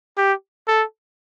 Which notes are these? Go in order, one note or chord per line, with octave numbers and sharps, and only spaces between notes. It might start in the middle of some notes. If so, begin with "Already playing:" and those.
G4
A4